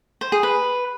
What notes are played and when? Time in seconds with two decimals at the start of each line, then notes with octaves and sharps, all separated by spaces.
0.21 C5
0.32 G#4
0.43 B4